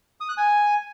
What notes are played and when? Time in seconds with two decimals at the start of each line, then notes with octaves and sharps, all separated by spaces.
0.20 D#6
0.29 F#6
0.37 G#5